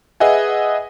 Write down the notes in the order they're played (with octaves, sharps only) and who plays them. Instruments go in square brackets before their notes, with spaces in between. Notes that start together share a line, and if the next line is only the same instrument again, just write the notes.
[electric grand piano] G#4 B4 D#5 E5 F#5 G#5